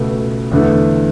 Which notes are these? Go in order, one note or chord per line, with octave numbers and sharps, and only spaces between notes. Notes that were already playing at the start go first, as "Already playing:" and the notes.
Already playing: C#2 B2 A3
E2 D3 A3